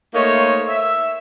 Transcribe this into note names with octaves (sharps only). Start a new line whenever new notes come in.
A3 A#3 D#4 C5 C#5
E5